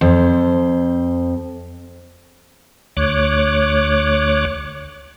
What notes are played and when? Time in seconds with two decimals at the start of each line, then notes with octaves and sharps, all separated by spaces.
0.01 F2 C5
2.97 D2 C#5 D6 F#6